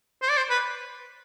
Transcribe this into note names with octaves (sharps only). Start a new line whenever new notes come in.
C5
D5
C5
B4